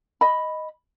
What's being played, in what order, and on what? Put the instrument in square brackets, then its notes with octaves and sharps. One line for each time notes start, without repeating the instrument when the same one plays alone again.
[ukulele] D#5 B5